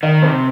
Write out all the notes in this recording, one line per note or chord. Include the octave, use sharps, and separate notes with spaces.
D#3 D#5
C3 C5